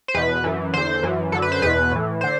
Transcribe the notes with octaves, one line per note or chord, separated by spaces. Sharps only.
C5
E2 B2 B4
F#2 E3
E2 D3 C5
F#2 E3
F#2 D3 A4
B4
C5
E2 B2 B4
A2 E3
D3 C5